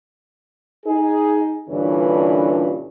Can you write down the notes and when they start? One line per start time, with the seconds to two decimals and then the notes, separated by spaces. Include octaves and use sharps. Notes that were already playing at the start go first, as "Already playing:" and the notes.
0.86 D#4 G#4
1.69 G2 A#2 D3 E3 C#4